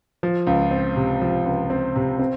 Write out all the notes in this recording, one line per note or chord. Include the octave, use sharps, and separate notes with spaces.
F3
C#2
C4
C3
F3
C#2
C4
C3
C4